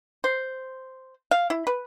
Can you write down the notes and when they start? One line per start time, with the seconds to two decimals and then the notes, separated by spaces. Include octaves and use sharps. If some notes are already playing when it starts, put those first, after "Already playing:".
0.24 C5
1.31 F5
1.50 E4
1.67 B4